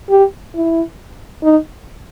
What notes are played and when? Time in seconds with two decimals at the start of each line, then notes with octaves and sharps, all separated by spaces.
0.10 G4
0.55 E4
1.43 D#4